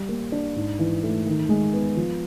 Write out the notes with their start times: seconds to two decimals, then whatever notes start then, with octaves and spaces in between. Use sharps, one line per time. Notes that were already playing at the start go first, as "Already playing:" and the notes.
Already playing: G3
0.09 A#3
0.32 D4
0.56 G#2
0.79 E3
1.03 A3
1.27 D#3
1.49 G#3
1.73 B3
1.97 F3